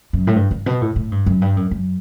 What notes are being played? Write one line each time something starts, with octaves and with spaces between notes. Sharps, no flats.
F#2
A2
G2
G2
B2
A2
A2
G2
F#2
G2
F#2
F#2